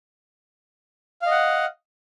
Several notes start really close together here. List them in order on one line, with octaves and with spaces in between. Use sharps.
F5 D#5 F#5